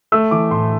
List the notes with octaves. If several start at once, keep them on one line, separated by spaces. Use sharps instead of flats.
A3 E6
E3 D6
A2 C6